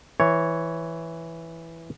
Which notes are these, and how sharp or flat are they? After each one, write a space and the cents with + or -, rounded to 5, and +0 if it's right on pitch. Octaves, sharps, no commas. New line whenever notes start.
E3 +0 C#5 +0